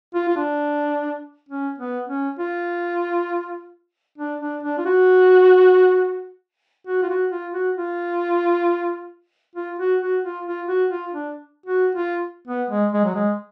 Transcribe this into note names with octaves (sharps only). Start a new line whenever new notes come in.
F4
F4
D4
C#4
B3
C#4
F4
D4
D4
D4
F4
F#4
F#4
F4
F#4
F4
F#4
F4
F4
F#4
F#4
F4
F4
F#4
F4
D4
F#4
F4
B3
G#3
G#3
F#3
G#3